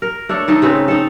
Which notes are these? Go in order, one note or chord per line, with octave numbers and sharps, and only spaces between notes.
A#4
A3 D4 A4 C#5
D#3 D#4 A4
C#3 C4 B4 C5
D#4 A4